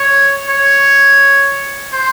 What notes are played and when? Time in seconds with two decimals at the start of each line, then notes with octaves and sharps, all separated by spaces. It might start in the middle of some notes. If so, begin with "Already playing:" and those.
Already playing: C#5
0.48 C#5
1.93 C5